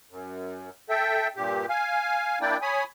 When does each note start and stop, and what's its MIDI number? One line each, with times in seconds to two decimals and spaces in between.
0.11 0.70 42
0.89 1.28 69
0.89 1.28 76
0.89 1.28 79
1.36 1.66 43
1.36 1.66 46
1.36 1.66 67
1.69 2.39 77
1.69 2.39 80
2.41 2.57 58
2.41 2.57 62
2.41 2.57 64
2.41 2.57 74
2.41 2.57 79
2.62 2.84 73
2.62 2.84 80
2.62 2.84 83
2.62 2.84 87